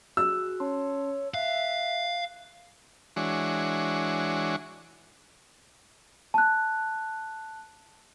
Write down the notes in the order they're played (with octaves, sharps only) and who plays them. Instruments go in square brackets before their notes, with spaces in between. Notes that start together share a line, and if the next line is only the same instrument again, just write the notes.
[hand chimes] F#4 G#4 F#6 [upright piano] E6
[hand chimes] C#4 A5 C6 [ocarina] C#5
[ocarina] E5 [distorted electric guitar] F5 [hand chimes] F#6
[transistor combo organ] E3 G#3 D4 F#4 C#5
[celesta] A5 F#6